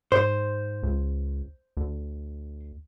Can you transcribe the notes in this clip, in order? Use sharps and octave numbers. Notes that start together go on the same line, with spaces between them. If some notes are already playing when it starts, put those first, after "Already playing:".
G#2 C5
C#2
D2